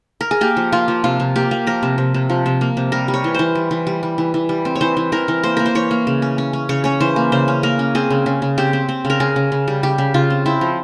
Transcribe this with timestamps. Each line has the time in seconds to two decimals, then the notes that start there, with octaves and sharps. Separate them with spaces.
0.21 A#4
0.31 G#4
0.41 A#3 G4
0.57 F3
0.72 A#3 F4
0.88 F3
1.04 C3 F4
1.20 C3
1.36 A#3 G4
1.51 A#3
1.67 F3 A#4
1.83 C3
1.98 C3
2.14 C3
2.30 F3
2.46 C3
2.61 A#3
2.77 C3
2.92 G3 A#4
3.08 G3
3.14 C#5
3.24 E3
3.35 E3 C5
3.55 G3
3.71 E3
3.87 G3
4.03 G3
4.18 E3
4.34 E3
4.49 G3
4.65 C4
4.75 C#5
4.81 E3 C5
4.97 E3
5.12 E3 A#4
5.28 E3
5.44 A#3 C5
5.57 A#3 A#4
5.66 C5
5.75 E3 C#5
5.91 A#3
6.07 C#3
6.22 C#4
6.38 C#4
6.53 C#4
6.69 C#3 C#5
6.84 C#4 C#5
7.01 E3 C5
7.16 A#3
7.32 C#3 C5
7.48 C#4
7.63 A#3 A#4
7.79 C#4
7.95 C4 G#4
8.10 C#3
8.26 C#3
8.42 C#3
8.58 C4 G4
8.73 C4
8.89 C4
9.05 C#3
9.10 A#4
9.20 C#3 G#4
9.36 C#3
9.52 C#3
9.68 G3
9.83 C#3 G4
9.98 C#3
10.14 C#3 F4
10.30 C4
10.46 C4 E4
10.61 F3